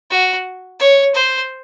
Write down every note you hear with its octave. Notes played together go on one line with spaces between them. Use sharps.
F#4
C#5
C5